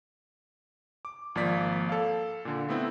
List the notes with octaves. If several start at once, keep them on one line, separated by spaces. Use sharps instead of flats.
D6
G#1 F3 A#3 D5 B6
A4 F5
A#2 D3
A3 B3 C4 E4